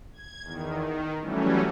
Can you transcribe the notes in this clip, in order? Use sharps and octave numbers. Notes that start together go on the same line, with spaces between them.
G#6
E2 D#3
D#3
E3 F#3 G3 A3 C#4